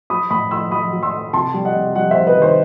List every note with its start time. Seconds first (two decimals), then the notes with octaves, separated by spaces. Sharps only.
0.10 F#3 B5 D#6
0.30 A2 B5 D#6
0.51 A3 C6 E6
0.71 F#3 B5 D#6
0.93 F#3
1.03 C6 E6
1.13 A3
1.33 C3 A5 C6
1.54 G3
1.65 D#5 F#5
1.75 C3
1.95 G3 D#5 F#5
2.11 C5 E5
2.17 C3
2.27 B4 D#5
2.37 D#3 C5